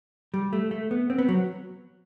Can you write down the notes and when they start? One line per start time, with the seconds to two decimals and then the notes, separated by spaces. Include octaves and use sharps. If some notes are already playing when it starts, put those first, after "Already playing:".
0.34 G3
0.53 A3
0.71 A3
0.91 B3
1.10 C4
1.18 B3
1.28 F#3